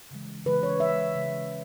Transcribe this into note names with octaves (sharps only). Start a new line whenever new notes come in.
C#3 E3 G#3
C#3 E3 G#3 B4
C#5
C#3 G#3 E5
C#3 G#3